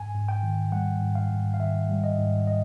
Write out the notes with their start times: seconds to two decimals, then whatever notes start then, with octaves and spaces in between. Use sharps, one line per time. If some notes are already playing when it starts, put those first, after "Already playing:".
Already playing: G#2 G#5
0.14 G#2
0.29 G5
0.43 D#3
0.72 G3 F#5
1.01 G#2
1.15 F5
1.30 G#2
1.54 F5
1.60 D#3 E5
1.90 G3
2.04 D#5
2.18 G#2
2.47 D#5